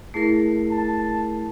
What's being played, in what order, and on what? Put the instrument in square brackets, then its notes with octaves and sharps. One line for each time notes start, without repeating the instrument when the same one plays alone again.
[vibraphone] A3 A#4 [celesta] E4 G#4 C7
[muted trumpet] A5